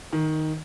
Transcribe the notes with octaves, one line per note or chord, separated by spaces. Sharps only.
D#3